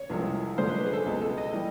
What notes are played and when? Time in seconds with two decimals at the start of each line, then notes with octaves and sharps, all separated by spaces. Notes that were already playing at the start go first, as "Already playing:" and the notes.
Already playing: C#5
0.10 C2 C3 F3 G#3
0.57 F#2 D3 F3 G#3 C5
0.69 B4
0.86 G#4
0.93 A4
1.06 C#2 B2 G#3
1.22 A4
1.38 D#5
1.53 E3 G3